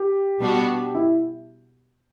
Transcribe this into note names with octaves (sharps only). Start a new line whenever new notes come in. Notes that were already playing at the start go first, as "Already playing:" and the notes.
Already playing: G4
B2 G3 B3 D4 F#4
E4